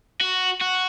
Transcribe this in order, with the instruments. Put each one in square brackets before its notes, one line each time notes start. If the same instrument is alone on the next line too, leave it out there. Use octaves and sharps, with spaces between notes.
[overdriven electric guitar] F#4
F#4